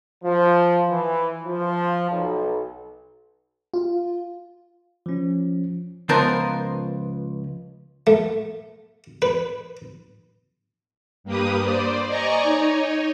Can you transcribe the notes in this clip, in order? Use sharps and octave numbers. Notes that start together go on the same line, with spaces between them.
F3
E3
F3
B1
F4
F3 C#4
C#2 F3 B3 A#4 C5 A5
A3
B4
G2 A#3 G4 B4 D#6
C5 D5
D5 D#5 G#5 A#5 C#6
D#4 C#5 D#5